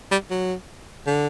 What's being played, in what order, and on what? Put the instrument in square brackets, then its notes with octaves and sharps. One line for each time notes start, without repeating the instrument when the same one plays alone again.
[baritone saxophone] G3
F#3
D3